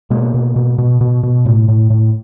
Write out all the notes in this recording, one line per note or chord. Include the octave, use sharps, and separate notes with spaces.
B2 G#3 A#3
B2
B2
B2
B2
B2
A2
A2
A2